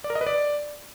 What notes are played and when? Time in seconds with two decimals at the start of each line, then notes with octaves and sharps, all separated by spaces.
0.04 D5
0.10 A#4
0.15 D#5
0.21 B4
0.27 D5